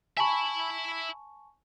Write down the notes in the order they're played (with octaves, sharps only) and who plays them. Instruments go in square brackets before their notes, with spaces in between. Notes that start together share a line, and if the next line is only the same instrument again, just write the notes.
[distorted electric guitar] E5 B5 [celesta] G#5 A5 C#6